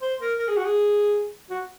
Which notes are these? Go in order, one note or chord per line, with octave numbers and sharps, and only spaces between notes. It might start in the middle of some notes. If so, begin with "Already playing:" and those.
C5
A#4
A#4
G#4
F#4
G#4
F#4